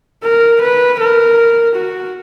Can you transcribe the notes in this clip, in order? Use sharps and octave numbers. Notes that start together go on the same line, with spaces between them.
A#4
B4
A#4
F#4